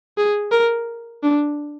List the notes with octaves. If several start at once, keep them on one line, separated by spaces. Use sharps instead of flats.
G#4
A#4
D4